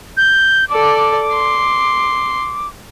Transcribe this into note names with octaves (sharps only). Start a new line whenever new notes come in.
G6
A4 D5 D6
C6